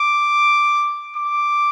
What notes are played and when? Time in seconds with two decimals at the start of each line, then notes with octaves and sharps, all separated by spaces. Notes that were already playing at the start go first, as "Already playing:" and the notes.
Already playing: D6
1.17 D6